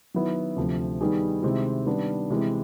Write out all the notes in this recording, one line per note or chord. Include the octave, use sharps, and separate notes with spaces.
D#3 F#3 B3 E4
D2 C3 F3
D#3 G3 B3 D#4 G#4
C3 D#3 G#3 C4 E4
D#3 G3 B3 D4
C3 E3 G#3